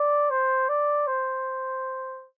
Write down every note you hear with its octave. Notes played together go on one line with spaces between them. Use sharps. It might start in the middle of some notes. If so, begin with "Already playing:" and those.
Already playing: D5
C5
D5
C5